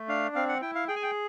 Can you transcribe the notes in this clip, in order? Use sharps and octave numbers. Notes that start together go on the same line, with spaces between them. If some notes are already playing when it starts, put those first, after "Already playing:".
Already playing: A3
D4 F5
C4 F5
F#5
E4 G5
F5
G#4 G5
G#5
G5